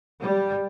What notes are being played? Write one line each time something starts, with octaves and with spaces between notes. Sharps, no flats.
G3